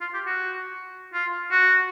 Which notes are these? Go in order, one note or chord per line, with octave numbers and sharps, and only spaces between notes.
F4
G4
F#4
F4
F#4